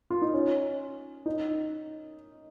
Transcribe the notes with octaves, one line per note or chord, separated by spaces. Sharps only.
F4
D#4
C#4
D#4